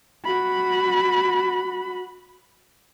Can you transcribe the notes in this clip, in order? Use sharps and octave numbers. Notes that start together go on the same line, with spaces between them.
F#4 B5